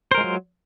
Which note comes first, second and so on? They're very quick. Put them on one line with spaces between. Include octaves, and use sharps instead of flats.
C5 A#4 G#3 F4 F#3